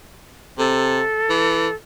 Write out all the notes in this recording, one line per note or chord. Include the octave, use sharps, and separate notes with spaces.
C3 A4
E3